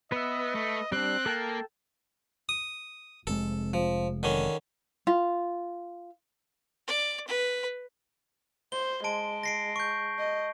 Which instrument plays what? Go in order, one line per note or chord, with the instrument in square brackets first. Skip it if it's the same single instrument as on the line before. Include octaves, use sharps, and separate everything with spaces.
[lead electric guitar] B3 [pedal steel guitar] B4 E5 [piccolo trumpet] D#5
[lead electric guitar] A3
[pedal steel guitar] G3 D4 [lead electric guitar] C4 [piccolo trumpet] F#6
[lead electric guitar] A#3 [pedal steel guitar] A4 G5 A5
[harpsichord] D#6
[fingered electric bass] F1 C3 G#3 [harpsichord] A4
[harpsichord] F3
D3 D#3 C#4
[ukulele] F4
[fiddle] D5
B4
[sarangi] C5 [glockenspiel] G7
[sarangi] G#3 [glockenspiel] A5 D7
[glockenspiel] A#6 C7 D7
C#6 G6
[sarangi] D#5